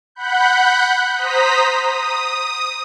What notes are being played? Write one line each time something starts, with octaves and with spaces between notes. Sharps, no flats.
F#5 B5 F#6 G6
C5 A#5 D#6 B6
D#6